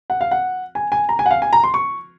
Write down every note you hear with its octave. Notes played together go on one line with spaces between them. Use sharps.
F#5
F5
F#5
G#5
G#5
A#5
G#5
F#5
F5
G#5
A#5
C6
C#6